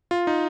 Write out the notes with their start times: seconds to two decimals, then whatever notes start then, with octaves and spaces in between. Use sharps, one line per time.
0.11 F4
0.27 D#4